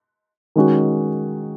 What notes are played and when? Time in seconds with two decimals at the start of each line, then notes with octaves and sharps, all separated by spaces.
0.56 D#3 G#3 C#4 F#4